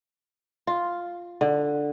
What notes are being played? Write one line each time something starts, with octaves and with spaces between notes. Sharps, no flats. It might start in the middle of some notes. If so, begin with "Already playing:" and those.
F4
D3